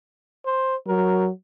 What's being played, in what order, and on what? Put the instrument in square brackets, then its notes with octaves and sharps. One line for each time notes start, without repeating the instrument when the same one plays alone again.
[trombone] C5
[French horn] F#3 [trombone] A#4